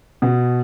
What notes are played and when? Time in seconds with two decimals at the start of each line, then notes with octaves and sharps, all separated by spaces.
0.22 B2